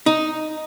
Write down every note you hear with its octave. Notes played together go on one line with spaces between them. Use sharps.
D#4